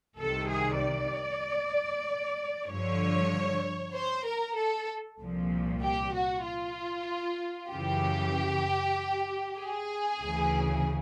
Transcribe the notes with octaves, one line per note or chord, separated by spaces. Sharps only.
C2 C3 D#3 A4
G#4
D5
G2 D3 F3 C#5
C5
A#4
A4
C2 A#2 F3
G4
F#4
F4
F#2 C#3 E3 G4
G#4
D2 C#3 E3